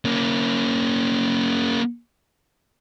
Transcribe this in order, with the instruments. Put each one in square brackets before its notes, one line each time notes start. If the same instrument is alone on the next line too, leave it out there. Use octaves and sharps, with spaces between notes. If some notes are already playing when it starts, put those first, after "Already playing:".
[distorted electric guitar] A#3 C#4